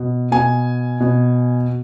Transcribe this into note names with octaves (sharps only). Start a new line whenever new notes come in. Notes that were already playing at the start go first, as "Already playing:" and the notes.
Already playing: B2
B2 G#5
B2